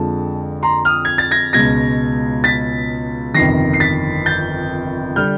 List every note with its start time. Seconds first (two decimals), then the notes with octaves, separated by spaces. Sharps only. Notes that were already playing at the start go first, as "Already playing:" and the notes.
Already playing: F2 D3 F3 G#3 A5
0.63 A#5 C6
0.85 D#6 F6
1.05 G#6
1.18 A6
1.31 G#6 A#6
1.53 C#2 B2 G#3 G#6 A#6
2.44 A6 B6
3.35 G1 F2 C3 D#3 A#6 C7
3.73 C7
3.80 A6 B6
4.26 G6 A6
5.16 D3 G3 F6 G6